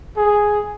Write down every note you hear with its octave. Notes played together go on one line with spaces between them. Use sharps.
G#4